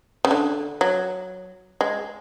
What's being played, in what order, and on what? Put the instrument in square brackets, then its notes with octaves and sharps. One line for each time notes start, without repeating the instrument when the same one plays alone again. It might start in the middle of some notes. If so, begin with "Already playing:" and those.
[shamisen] C#3
D3
F#3
G#3